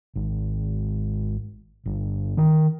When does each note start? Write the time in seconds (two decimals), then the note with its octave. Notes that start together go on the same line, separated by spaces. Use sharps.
0.16 G#1
1.86 G1
2.37 D#3